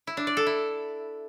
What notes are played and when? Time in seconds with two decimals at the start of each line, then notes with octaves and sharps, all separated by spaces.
0.07 E4
0.17 D4
0.27 D5
0.37 A4
0.47 E4